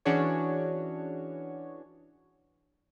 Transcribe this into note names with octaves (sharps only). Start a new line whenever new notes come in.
E3 C#4 D4 F#4 G#4 C#5